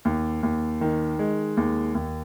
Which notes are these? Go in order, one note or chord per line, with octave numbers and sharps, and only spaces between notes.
D#2
D#2
D#3
G#3
D#2
D#2